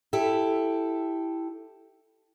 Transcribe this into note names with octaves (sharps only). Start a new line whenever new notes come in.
E4 G4 A4